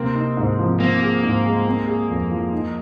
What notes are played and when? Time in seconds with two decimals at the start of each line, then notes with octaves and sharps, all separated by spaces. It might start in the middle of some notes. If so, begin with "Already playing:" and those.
Already playing: C3 A#3 C4
0.15 D#4
0.37 G#2
0.59 F3
0.80 A#3 C4
1.02 G#4
1.23 G#2
1.45 G#3
1.66 C4
1.87 G#4
2.09 F2
2.31 F3
2.52 D#4